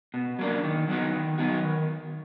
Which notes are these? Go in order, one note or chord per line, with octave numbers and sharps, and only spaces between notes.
B2
F#3 A#3 D4
D#3
F#3 B3 D#4 F#4
D#3
F#3 B3 D#4 F#4
D#3